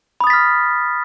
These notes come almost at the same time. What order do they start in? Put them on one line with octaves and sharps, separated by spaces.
B5 D#6 A6 B6 F6